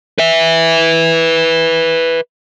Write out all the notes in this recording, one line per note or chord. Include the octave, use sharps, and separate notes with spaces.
B4 E5